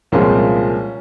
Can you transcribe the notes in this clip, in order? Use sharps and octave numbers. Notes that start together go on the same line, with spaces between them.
C2 A#2 F3 G#3 C4 C#4